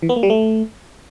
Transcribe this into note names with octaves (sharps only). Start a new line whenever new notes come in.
E3
B3
A#3
G3
A3